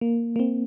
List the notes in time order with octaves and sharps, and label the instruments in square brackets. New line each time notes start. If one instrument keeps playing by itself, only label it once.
[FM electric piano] A#3
A#3
C4